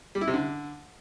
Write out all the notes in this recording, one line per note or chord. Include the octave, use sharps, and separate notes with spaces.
G3
E4
C3
D3